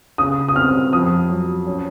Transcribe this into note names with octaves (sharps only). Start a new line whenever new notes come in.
C#3 D#6
D#6
C4 F6
F2 D#6
F#3
C#4